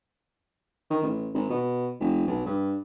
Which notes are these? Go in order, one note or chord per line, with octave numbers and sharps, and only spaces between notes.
D#3
A1
G#1
B2
F1
B1
G2